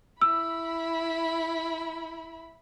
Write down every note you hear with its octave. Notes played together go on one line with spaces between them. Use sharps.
E4 B5 E6